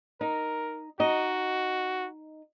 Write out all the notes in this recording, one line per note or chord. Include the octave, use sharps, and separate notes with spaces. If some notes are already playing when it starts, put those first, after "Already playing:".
D#4 A#4
D#4 F#4 D#5